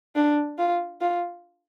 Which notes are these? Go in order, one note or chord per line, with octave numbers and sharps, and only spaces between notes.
D4
F4
F4